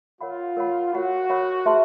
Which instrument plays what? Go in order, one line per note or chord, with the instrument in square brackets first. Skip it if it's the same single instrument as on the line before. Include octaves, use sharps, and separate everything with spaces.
[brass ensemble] F4 [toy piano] A#4 C#5 F#5 B5
[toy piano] A#4 C#5 F#5 B5
[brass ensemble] F#4 [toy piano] A#4 C#5 F#5 B5
[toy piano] A#4 C#5 F#5 B5
G#4 B4 E5 A5 C6